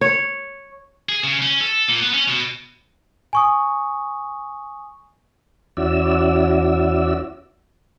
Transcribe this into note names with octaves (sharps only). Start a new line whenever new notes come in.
C#5
G#4
C#3
C#4
A4
A#2
B3
C#4
B2
G#5 C#6 D#6
E2 C#4 E4 F#4 D5 E6